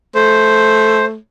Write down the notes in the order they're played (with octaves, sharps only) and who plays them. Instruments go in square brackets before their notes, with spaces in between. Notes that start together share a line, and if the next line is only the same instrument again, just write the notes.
[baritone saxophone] A3 [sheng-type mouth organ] C5